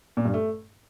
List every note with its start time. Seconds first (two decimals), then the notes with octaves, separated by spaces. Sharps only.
0.17 A#2
0.25 G2
0.34 A3